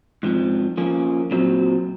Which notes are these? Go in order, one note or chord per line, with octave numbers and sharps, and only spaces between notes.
G#2 F3 C4
F3 A#3 C#4
A#2 F#3 C4